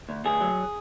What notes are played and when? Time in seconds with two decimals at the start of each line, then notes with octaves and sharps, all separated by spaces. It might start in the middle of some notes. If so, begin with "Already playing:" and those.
0.09 D2
0.25 D2 G#4
0.41 F#3